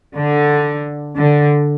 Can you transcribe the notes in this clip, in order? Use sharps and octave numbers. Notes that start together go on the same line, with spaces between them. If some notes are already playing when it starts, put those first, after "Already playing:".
D3
D3